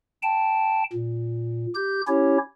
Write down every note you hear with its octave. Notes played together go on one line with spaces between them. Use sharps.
G5 A5
A#2
G4 G6
C#4 E4 G4 C#5